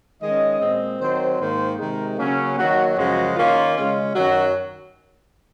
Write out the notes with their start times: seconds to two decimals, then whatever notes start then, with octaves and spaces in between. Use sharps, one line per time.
0.21 D#3 G#3 C#4 D#5
0.60 A#2 G#3 C4
1.00 D#3 F#3 C4 C5
1.39 G#2 D#3 A#3 C5
1.78 C3 D#3 G#3 A#4
2.18 C#3 F#3 A#3 C#4
2.57 D#3 F#3 A#3 F#4
2.96 F#2 C#3 F3 G#3 F#4
3.35 D#3 A#3 C#4 F4
3.75 C#3 G#3 C#4
4.14 F#2 D#3 F#3 F#4